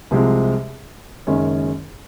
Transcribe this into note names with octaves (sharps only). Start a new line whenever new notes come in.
C2 C3 F3 G#3
F#1 F#2 D#3 G#3 C#4